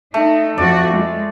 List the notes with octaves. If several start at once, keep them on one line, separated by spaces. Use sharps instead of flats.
A3 D#4
F2 F#4 D5
G#3